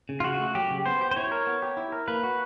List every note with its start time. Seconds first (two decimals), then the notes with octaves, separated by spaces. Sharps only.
0.09 C#3
0.20 F4
0.24 C#3 F#4
0.40 A3
0.55 F#3 G4
0.71 C#3
0.86 B3 C5
1.01 G4
1.11 C5
1.16 E4 C#5
1.31 A#4
1.47 B3
1.62 G4
1.77 E4
1.92 A#4
2.08 A#3 B4
2.23 F#4